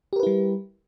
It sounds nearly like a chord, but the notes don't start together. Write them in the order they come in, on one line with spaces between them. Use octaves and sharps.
G4 A#4 B4 E4 G3